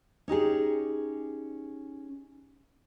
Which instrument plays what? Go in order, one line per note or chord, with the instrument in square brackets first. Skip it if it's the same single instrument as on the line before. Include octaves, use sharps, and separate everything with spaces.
[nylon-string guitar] C#4 D#4 G4 G#4